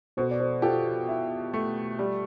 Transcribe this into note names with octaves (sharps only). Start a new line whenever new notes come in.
B2 A4 C5
D5
A4 C5
F4 G4 A4
E4
A3
G3